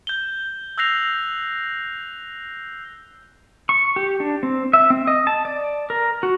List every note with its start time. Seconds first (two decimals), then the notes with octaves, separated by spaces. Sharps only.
0.07 G6 G7
0.78 E6 F#6 G6 A#6 C7 F7
3.69 C#6
3.96 G4
4.20 D4
4.43 C4
4.73 E5
4.90 C4
5.07 D#5
5.27 A5
5.45 D5
5.90 A#4
6.23 F#4